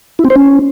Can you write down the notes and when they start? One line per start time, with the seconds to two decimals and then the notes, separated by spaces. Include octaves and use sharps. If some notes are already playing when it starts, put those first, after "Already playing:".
0.19 E4
0.25 C4
0.30 C5
0.36 C#4